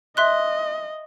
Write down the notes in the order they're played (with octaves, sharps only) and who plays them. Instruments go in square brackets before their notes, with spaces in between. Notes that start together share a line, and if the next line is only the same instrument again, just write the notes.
[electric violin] D#5 [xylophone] E5 C6 F#6